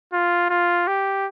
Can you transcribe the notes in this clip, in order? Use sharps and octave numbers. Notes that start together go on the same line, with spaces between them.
F4
F4
G4